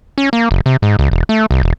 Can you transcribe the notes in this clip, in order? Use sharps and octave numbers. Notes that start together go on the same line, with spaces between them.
C#4
A#3
F#1
C3
G#2
C#2
E1
A3
C2
E1